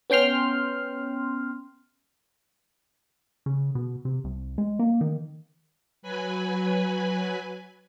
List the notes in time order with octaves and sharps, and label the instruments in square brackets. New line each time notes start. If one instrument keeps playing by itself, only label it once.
[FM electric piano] B3 C#4 G5 C6 F6
[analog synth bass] C#3
B2
C3
C2
G#3
A#3
D#3
[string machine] F#3 B4 G#5 B5